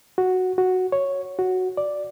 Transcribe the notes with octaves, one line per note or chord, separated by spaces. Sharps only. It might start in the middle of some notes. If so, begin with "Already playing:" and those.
F#4
F#4
C#5
F#4
D5